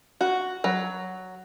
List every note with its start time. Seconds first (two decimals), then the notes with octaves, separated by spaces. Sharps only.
0.21 F#4
0.64 F#3